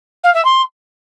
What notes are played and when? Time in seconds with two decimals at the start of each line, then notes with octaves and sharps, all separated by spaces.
0.23 F5
0.34 E5
0.45 C6